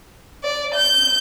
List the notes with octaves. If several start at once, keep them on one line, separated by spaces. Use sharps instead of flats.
D5
G6